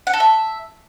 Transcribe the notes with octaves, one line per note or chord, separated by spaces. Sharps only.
F#5
A4
E5